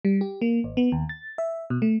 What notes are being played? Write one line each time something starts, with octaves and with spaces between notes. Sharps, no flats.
G3
G4
A#3
G#1
B3
D#2
A6
E5
B2
A3